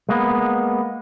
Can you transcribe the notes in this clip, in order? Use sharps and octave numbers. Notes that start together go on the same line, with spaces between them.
G#3 A#3 B3